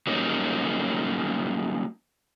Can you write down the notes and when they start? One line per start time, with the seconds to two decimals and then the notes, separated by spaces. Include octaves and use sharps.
0.07 F#3 G3 A#3 C#4 D#4